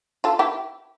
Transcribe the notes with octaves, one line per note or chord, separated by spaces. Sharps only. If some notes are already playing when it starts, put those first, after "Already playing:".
F4 A4
E4 G4